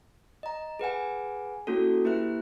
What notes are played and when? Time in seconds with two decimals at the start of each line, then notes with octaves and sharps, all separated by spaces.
0.43 D#5 A#5
0.79 G#4 B4 F#5 G#5
1.67 A#3 C#4 E4 F#4 A4
2.04 A#3 E4 G4 B4 E5 F#6